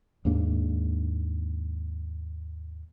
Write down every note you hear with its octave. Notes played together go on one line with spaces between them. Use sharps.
D#2 G#2 A#3 D4